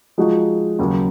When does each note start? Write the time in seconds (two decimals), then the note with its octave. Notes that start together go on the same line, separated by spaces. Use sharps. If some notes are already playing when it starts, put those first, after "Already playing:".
0.18 F3 G#3 D#4 F#4
0.79 D#2 C#3 F#3